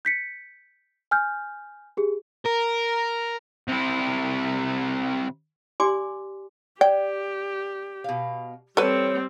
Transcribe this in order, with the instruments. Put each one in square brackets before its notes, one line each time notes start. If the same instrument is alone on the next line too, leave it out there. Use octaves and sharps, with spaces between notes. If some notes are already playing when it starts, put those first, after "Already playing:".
[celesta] G6 B6 C#7
G#5 F6 G6
G4 G#4
[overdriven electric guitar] A#4
[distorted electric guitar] C3 E4
[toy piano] G4 D5 G#5 C6 D6
[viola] G4 [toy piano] D5 [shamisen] G5
[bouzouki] B2 F5
[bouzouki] E3 C#5 A5 [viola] G3 C4 [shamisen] A4 B4